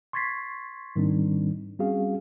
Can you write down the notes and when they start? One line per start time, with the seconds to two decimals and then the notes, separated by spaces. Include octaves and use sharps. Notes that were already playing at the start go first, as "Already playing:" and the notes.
0.13 C6 C#6 G#6 A6 B6 C7
0.96 G#2 D#3 G3 C4 D4 D#4
1.79 G3 C4 C#4 F#4 G#4 F5